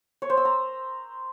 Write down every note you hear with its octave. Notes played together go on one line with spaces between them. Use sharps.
C#5
C5
E6
A#5